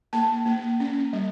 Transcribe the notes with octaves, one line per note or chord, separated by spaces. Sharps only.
A#3 A5
A#3
C#4
G3